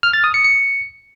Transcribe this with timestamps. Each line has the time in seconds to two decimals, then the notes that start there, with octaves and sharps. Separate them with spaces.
0.03 F6
0.13 A6
0.24 D#6
0.34 C#7
0.44 C#7